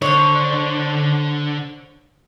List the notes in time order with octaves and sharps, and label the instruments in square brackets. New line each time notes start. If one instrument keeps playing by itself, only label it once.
[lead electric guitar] D3 D4 [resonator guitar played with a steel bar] C5 C#5